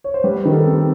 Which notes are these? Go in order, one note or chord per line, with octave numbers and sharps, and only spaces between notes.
C#5
C5
G3 B4
D#3
A4
C4